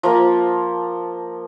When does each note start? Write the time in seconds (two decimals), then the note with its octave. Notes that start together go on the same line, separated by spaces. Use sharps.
0.03 F3 A#3